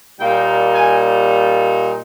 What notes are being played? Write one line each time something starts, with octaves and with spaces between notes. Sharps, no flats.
A#2 G3 A#3 D#4 G5
G#5